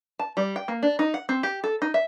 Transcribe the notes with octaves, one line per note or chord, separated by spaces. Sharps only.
A5
G3
G5
A#3
D4
D#4
F#5
C4
G4
A4
D#4
E5